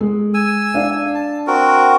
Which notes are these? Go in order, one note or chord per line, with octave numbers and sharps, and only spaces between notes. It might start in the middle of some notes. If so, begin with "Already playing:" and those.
G#3
G#5 E6
D4 F5
A5
C4 F#4 A#4